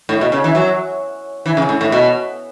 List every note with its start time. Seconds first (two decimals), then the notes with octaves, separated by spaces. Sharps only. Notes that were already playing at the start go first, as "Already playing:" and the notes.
0.09 A2
0.21 B2
0.32 C#3
0.44 E3
0.55 F#3
1.46 E3
1.57 C#3
1.69 A2
1.81 A2
1.92 B2